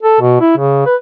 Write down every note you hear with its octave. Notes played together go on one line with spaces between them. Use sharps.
A4
B2
E4
C#3
B4